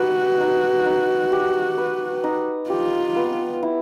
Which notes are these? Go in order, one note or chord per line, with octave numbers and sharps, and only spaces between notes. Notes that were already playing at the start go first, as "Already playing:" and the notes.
Already playing: D#4 F#4 G4 B4
D#4
D#4
G4
B4
D#4
F4 G4
B3
E4